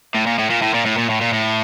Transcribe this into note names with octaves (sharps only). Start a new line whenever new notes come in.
A2
A#2
A2
A#2
A2
A#2
A2
A#2
A2
A#2
A2